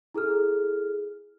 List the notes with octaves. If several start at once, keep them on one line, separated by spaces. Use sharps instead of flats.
E4 G#4 A4 F6